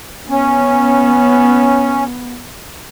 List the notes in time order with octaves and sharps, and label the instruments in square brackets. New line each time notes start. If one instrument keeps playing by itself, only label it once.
[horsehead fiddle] B3 [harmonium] C#4